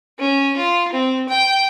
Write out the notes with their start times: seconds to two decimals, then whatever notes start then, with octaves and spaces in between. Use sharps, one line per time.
0.19 C#4
0.57 F4
0.93 C4
1.29 G5